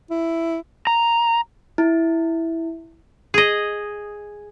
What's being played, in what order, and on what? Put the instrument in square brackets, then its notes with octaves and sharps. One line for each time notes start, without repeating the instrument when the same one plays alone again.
[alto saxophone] E4
[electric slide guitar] A#5
[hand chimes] E4
[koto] G#4 D#5